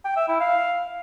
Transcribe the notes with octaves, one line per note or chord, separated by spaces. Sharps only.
G5
E5
E4
F5